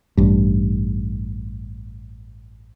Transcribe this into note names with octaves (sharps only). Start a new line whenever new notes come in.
A1 G2